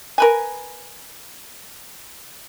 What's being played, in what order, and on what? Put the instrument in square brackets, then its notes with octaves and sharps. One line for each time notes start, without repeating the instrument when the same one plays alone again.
[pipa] A#4 B4 G#5